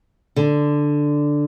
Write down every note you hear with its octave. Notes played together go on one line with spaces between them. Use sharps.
D3